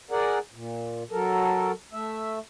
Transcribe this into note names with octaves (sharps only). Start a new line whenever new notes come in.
G#4 A#4 D5 F#5
A#2
F#3 A4 A#4
A3 E5